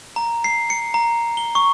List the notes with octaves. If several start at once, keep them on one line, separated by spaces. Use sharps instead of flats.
A#5
C7
C#7
A#5
G7
C#6